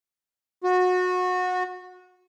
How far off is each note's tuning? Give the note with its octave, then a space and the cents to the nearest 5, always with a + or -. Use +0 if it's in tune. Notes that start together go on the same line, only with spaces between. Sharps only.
F#4 -25